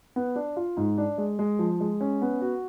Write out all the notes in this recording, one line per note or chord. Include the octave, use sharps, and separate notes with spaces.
B3
D4
F4
G#2
D4
G#3
G#3
F3
G#3
C#4
B3
F#4